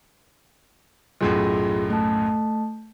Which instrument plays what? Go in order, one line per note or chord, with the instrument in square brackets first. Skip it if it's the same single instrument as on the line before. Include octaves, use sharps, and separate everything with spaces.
[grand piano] B1 F#2 A2 [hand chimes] F4 G#4 C6
[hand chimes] A3 A5